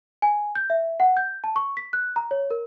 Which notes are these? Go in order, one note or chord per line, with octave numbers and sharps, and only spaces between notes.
G#5
G6
E5
F#5
G6
A5
C#6
B6
F#6
A#5
C#5
A#4